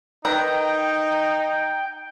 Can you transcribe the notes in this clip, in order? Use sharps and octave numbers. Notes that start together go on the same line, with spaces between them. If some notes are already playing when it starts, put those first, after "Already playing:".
D#3 D#4 B4 G5 A#5